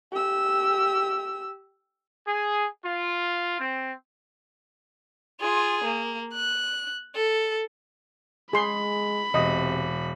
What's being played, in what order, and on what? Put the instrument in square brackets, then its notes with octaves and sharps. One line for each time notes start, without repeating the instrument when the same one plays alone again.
[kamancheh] G4 E6
[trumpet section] G#4
F4
C4
[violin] F4 G#4
A#3
F#6
A4
[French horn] G#3 [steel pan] G#4 C6 [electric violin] B5
[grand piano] E1 [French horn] C3 [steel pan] D#5